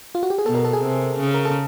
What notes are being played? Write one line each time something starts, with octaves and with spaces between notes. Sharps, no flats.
F4
F#4
G4
G#4
B2 A4
A#4
A4
G#4
C3
C#3
A#4
A4